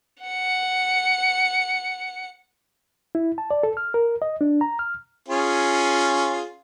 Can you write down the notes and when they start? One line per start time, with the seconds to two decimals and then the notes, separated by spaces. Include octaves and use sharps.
0.24 F#5 C#7
3.15 E4
3.38 A5
3.51 D5
3.63 A4
3.77 F6
3.94 A#4
4.22 D#5
4.41 D4
4.61 A#5
4.79 F6
5.28 C#4 F4 G#4